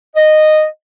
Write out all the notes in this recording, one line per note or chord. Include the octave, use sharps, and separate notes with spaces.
D#5